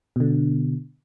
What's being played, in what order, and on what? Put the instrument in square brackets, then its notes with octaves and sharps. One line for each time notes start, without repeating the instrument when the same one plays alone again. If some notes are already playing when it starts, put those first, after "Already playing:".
[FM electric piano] B2 D3